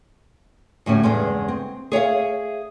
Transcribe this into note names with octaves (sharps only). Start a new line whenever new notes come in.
D2 A2 G3 C#4
E2 G2 C#3 G#3
C4
G#4 C#5 E5 F5